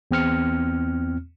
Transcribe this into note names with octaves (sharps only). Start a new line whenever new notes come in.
E2 C4 F6 C#7